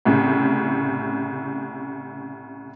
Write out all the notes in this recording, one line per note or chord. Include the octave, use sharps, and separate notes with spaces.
C2 A2 C#3